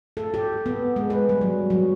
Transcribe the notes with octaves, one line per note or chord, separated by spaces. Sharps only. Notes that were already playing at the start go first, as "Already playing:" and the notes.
A4
G4
B3
G#3
B4
G3
F#3
F#3